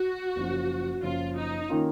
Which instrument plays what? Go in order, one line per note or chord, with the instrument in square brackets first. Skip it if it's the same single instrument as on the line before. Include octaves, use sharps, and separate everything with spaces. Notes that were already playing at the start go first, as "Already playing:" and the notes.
Already playing: [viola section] F#4
[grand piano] F#1 F#2 F3
[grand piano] F#1 F#2 F3 [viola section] F4
[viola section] D#4
[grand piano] D#3 A#3 C#4 F4